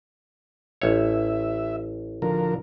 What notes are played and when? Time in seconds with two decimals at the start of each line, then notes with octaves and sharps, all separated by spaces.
0.82 A1 C#5 E5
2.22 D3 F3 A#4